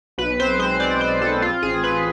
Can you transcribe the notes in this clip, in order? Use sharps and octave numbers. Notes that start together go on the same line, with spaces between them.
B1 B4
C4 C5
G#3 C5
C4 D5
C4 C5
B1 A4
C4 F4
A1 G#4
C4 B4